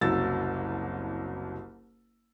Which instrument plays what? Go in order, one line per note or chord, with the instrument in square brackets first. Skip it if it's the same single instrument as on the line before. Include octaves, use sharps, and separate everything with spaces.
[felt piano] F#1 C2 F#3 E6 A6